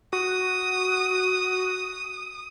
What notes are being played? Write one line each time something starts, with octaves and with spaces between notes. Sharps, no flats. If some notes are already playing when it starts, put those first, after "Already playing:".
F#4 D#6